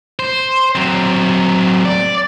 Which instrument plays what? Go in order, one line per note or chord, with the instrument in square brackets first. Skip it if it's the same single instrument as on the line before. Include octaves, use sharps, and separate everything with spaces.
[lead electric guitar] C5
F#3 C4
D5